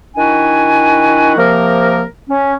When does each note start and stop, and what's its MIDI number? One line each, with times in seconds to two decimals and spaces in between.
0.17 1.34 51
0.17 1.34 62
0.17 1.34 64
0.17 1.34 66
0.17 1.34 80
1.37 2.03 48
1.37 2.03 53
1.37 2.03 58
1.37 2.03 70
2.30 2.54 61